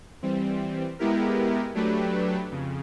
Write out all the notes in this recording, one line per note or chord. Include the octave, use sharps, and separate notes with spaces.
E3 G3 C4
G#3 B3 E4 G4 A#4
F#3 A3 D4 G4 B4
F2 C#3